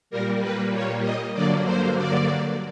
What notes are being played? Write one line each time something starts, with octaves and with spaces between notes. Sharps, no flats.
A#2 G3 A#3 A#4
B4
C#5
D#5
G2 D3 F#3 A#3 D5
C5
D5